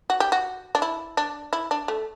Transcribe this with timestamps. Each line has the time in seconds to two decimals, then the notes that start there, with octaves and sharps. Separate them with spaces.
0.10 F#4
0.20 G4
0.32 F#4
0.75 D4
0.82 E4
1.17 D4
1.53 E4
1.71 D4
1.88 A3